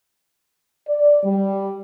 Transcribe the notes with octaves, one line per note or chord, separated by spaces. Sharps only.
D5
G3